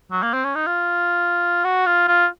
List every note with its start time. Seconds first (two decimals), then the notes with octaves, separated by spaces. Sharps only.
0.12 F#3
0.23 A#3
0.34 C4
0.44 C#4
0.56 D#4
0.67 F4
1.65 F#4
1.86 F4
2.08 F4